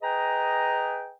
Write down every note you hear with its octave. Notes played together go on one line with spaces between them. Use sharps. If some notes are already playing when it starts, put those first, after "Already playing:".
G#4 B4 D#5 G5 G#5 A#5